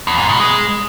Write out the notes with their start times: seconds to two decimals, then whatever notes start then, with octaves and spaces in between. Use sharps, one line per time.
0.07 E2
0.18 G#2
0.29 B2
0.40 G#3